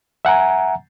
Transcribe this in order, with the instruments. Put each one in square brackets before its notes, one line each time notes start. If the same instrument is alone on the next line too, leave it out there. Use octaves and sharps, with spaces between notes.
[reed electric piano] E5 F#5 G#5 A#5